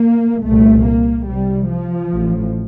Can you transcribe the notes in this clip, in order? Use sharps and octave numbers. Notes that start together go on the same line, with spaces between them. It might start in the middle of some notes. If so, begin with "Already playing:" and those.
Already playing: A#3
C2 A#2 A3
A#3
C2 C3 G3
F3
A1 A2